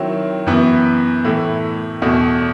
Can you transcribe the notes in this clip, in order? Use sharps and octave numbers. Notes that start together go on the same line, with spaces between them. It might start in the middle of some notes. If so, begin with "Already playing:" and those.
Already playing: D#3 F#3 C4 E4
F#2 E3 B3
A2 E3 A3
E2 B2 A3